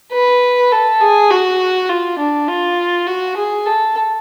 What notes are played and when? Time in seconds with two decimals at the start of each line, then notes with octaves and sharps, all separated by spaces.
0.12 B4
0.71 A4
1.01 G#4
1.30 F#4
1.89 F4
2.18 D4
2.48 F4
3.07 F#4
3.36 G#4
3.66 A4